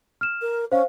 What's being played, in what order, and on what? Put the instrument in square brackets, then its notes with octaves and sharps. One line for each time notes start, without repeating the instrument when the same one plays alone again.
[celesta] F6 E7
[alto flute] A#4
[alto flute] C#4 [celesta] C5 F5